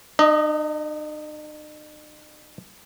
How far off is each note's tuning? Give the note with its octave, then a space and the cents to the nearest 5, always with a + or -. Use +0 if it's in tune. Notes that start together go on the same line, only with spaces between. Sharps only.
D#4 -45 D#5 +10